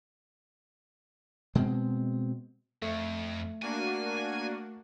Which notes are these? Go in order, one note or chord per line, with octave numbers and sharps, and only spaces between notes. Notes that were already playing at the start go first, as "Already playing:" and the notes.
B2 G#3 C4
F2 A3
A#3 D4 F#4 G#5